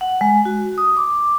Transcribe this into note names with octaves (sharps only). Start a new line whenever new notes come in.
F#5
G#3
F#4
D#6
D6